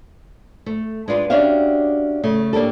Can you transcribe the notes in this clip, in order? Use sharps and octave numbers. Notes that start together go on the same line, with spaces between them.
A3
G#3 D4 F4 B4
C#4 D4 F#4 G4 E5 F5
C#3 A3
A2 A#3 D4 G4 A4